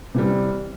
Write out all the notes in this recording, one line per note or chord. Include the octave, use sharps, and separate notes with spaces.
C3 E3 G3